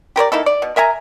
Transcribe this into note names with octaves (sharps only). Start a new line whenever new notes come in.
G4 A#4 C5 D5
A#3 D#4 E4 A4
D5
B2
A#4 E5 G#5 A#5